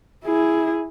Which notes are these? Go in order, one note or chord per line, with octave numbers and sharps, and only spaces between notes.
E4 G#4